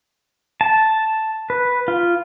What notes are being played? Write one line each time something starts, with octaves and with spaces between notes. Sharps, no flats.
A5
B4
F4